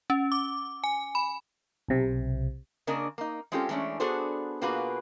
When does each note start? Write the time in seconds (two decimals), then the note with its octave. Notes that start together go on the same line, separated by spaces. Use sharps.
0.10 C#4
0.32 D6
0.84 G#5
1.15 B5
1.88 B1 C3
2.87 C#3 A#3 D4 A#4 D#5
3.18 A#3 D#4
3.52 G#3 C4 C#4 F4 G4 A4
3.69 E3 G#3 A3 C#4 D4
4.00 B3 D4 F#4 G#4 A4 C5
4.61 B2 A#3 F4 F#4 G#4 B4